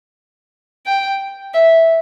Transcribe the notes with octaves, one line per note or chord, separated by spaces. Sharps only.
G5
E5